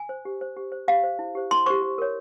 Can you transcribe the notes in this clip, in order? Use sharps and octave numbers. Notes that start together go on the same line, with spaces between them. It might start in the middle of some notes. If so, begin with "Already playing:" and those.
Already playing: G#5
C5
G4
C5
G4
C5
G4 F5
C5
E4
G4 C5
E4 C6
G4 C5 C#6
G4
A#4 C#5